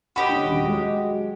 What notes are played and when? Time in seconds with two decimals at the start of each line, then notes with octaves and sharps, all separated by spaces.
0.16 F#4 G4 D#5 B5
0.29 D3 C#4
0.44 D#1
0.63 F#3 G#3